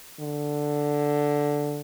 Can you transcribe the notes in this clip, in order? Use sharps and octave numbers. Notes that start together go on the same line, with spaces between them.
D3